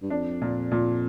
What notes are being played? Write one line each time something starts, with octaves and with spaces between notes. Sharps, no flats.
G2
F2 D4
A#2
A#2